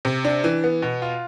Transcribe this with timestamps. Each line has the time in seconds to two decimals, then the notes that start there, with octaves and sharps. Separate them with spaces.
0.05 C3
0.25 D4
0.44 E3
0.64 B3
0.82 B2
1.02 F4